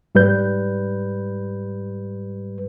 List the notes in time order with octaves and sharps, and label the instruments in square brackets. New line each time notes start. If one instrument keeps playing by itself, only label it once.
[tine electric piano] G#2 G3 B4 G6